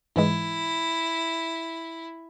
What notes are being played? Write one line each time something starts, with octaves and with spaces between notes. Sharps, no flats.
G#2 E3 G#3 E4